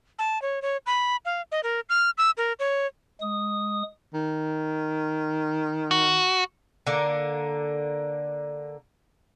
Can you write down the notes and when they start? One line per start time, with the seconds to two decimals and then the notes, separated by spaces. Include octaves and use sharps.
0.19 A5
0.42 C#5
0.62 C#5
0.86 B5
1.25 F5
1.52 D#5
1.63 A#4
1.89 F6
2.18 E6
2.37 A#4
2.59 C#5
3.21 G#3 D#6
4.14 D#3
5.91 F#4
6.87 D3 A#3